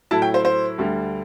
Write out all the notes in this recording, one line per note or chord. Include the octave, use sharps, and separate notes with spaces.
A2 F#3 A3 E4 A5
G5
C5
C5
D2 D3 G3